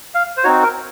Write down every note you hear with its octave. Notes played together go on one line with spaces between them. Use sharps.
F5
C5
C4 D#4 F#4 C#5
A#4